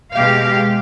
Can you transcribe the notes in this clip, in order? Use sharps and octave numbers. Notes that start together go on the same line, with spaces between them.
B2 G#3 G4 F5